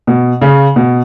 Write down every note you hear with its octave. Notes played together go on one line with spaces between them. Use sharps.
B2
C#3
B2